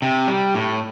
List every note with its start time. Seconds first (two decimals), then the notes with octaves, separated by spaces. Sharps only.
0.02 C3
0.28 G3
0.55 A2